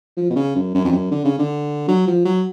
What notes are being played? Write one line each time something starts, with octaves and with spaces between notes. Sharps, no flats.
F3
B2
C#3
F#2
F#2
F2
F#2
D3
C#3
D3
F#3
F3
F#3